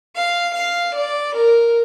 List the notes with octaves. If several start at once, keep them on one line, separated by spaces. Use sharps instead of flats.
F5
F5
D5
A#4